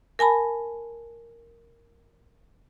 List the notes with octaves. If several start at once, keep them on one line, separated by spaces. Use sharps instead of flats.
A#4 G#5 A5 B5